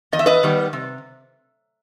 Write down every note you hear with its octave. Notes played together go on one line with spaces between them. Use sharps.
E2 D#5
E5
B4 D#5
D#3 G3 B3
C3